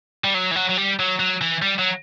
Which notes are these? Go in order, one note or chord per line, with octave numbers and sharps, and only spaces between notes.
G3
F#3
E3
F#3
F#3
G3
F#3
F#3
E3
G3
F#3